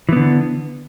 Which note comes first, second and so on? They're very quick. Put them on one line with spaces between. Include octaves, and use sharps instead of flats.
E3 B3 D3